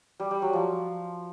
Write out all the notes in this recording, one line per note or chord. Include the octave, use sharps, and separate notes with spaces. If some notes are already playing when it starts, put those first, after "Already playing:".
G3
G3
F#3
F3